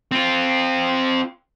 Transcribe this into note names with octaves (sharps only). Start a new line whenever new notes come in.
C4 F4